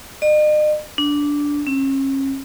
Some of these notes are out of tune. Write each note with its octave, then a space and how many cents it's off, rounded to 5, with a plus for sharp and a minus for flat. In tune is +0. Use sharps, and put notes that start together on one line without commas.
D#5 -45
D4 -10
C#4 -35